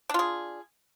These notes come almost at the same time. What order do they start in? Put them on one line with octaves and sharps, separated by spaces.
D4 F4 G#4